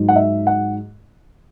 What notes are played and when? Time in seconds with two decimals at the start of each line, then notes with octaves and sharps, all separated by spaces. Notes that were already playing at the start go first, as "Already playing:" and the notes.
Already playing: G#2 F#3
0.09 F#5
0.16 E5
0.47 F#5